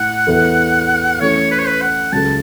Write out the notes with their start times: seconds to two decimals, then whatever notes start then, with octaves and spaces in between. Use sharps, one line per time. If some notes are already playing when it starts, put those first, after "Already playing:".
Already playing: A2 F#5
0.27 E2 E3 B3 E4 A4
1.20 E3 A3 C#4 C#5
1.51 B4
1.59 C#5
1.67 B4
1.81 F#5
2.12 C#2 C#3 F#3 C#4 A4 A5